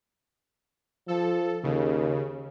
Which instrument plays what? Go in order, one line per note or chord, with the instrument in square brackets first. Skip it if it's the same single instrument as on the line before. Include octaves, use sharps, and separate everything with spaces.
[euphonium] F3 [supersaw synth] A4
[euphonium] D#2 [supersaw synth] C#3